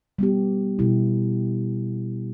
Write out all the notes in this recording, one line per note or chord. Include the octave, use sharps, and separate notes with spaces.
G3 B3 G4
B2 G3 E4 G4